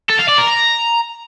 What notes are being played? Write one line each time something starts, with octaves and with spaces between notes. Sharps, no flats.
A4
F5
D5
A#4
A#5